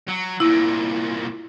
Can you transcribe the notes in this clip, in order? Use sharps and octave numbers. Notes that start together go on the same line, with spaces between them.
F#3
C2 A#2 E4